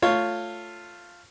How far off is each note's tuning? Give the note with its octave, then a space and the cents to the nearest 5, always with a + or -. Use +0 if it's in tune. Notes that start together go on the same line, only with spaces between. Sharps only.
A3 +15 F4 +0 C#5 +0